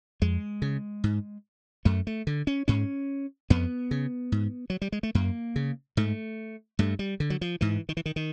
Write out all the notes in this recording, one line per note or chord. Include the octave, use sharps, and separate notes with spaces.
F2 G#3
C#3
G#2
F#2 A3
A3
D3
C#4
G#2 C#4
F2 B3
C#3
G#2
F#3
G3
G#3
A3
F#2 A#3
C#3
G#2 A3
G2 A3
G3
D3
F#3
F3
G#2 E3
D#3
E3
D#3
D#3